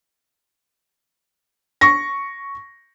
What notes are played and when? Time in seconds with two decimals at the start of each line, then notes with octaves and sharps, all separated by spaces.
1.81 C#6 A#6